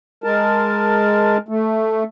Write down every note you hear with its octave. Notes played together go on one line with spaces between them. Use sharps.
G#3 A#4 A5
A3